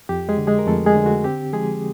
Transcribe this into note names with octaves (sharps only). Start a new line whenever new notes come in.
F2 G4
G#3 G#4
D3
G#3 G#4
A#4
F2 A3 A4
G#3 G#4
D3
F#4
C4 G4
F3 G#3 G#4